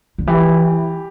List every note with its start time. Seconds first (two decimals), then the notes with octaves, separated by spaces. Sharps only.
0.18 D3
0.27 E3 G4